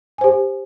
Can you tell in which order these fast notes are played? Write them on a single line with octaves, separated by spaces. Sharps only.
G#5 C5 G4